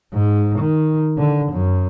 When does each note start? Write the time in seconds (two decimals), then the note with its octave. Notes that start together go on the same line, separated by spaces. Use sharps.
0.13 G#2
0.59 D#3
1.18 D3
1.52 F#2